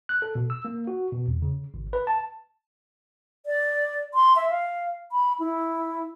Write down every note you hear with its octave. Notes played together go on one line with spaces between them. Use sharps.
F#6
A4
B2
E6
A#3
F#4
B2
E2
C#3
G#1
B4
A5
D5
C6
E5
F5
B5
E4